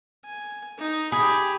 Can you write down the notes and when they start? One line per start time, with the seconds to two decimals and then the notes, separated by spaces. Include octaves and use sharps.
0.25 G#5
0.78 D#4
1.12 G4 G#4 B5